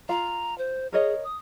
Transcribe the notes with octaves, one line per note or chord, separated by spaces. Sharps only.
F4 F5 A#5
C5
G#4 A#4 C#5 D#5
D#6